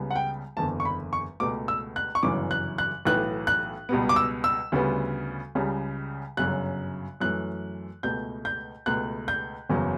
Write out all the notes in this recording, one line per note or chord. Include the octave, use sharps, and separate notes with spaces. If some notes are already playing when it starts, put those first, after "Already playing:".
Already playing: C#2 C#3 G3 B3
F#5
G5
F#1 E2 D3 A5
C#6
B5
C#6
C#2 B2 A3 D6
E6
F#6
C#6
G1 F#2 C#3 E3 D6
F#6
F#6
B1 A2 E3 B3 F#6
F#6
C#2 B2 G3 B3
D6
E6
E6
D2 C#3 G3 B3
C#2 C#3 G3
G1 F#2 C#3 F#3 F#6
F#2 E3 A3 F#6
C#2 B2 A3 G6
G6
C#2 B2 A3 F#6
G6
F#1 E2 C#3 F#3